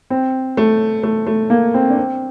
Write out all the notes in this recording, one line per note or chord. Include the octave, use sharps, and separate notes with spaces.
C4
A3
A3
A3
A#3
C4
D4
C4